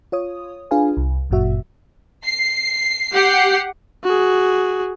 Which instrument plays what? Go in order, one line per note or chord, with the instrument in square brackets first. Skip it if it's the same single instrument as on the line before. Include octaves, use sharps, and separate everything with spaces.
[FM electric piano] F4 C#5 D#6
D4 F4 G#4 B4 F5 G#5
C2
G1 F#2 A#2 F#3 F#4 E5
[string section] C7
G4 F#5 C7
[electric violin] F#4 G#4